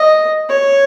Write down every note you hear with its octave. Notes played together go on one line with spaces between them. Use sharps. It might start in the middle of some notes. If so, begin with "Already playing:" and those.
Already playing: D#5
C#5